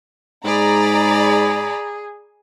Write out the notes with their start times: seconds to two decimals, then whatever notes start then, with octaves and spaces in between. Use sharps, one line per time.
0.45 G#2 G#4 D5 A#5 B5